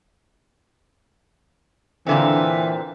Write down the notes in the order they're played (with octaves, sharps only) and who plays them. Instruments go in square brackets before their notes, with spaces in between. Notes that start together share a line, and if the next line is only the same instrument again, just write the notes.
[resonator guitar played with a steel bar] A#2 D3 C4 [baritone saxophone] E3